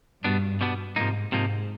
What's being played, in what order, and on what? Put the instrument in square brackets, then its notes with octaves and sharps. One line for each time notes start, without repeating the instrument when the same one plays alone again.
[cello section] G2 [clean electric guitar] B2 G3 B3 D4
[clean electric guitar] B2 G3 B3 D4
[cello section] G#2 [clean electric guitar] C3 F3 A#3 D#4
[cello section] G#2 [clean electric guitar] C3 F3 A#3 D#4